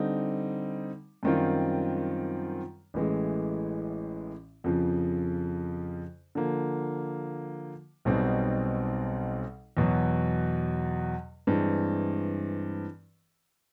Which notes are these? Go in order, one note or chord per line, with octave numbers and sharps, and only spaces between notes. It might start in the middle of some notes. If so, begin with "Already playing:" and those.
Already playing: D3 G3 C4 D#4
F#2 D#3 G3 C4 F4
A1 A2 E3 G#3
F2 C#3 F3
D3 F3 A#3
B1 B2 G3 C4 D#4
E2 B2 F#3
G2 E3 G#3 C4